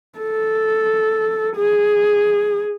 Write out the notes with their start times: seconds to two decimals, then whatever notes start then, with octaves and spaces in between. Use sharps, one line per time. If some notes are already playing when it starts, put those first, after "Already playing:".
0.19 A4
1.56 G#4